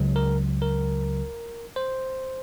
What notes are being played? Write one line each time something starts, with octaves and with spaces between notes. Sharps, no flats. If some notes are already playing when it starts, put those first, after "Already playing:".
Already playing: C#2 C#3 F#3
A#4
A#4
C5